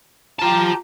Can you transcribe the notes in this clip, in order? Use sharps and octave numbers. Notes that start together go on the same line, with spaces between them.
F4 G4 A5 A#5